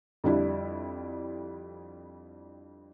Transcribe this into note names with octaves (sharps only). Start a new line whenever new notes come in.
F2 D3 G3 D4 E4